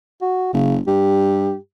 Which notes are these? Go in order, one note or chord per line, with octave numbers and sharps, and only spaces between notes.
F#4
F#1 C#3
G2 G4